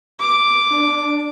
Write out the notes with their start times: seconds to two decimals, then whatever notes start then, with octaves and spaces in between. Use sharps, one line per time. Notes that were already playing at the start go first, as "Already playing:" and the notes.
0.20 D6
0.71 D4